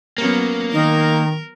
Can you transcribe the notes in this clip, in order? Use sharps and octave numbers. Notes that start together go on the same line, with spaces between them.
F#3 A#3 B3 C#4
D#3 D#4 A#4